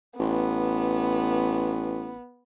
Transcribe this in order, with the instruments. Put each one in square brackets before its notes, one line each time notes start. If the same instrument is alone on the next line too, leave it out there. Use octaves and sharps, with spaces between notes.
[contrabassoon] A1 [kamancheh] B3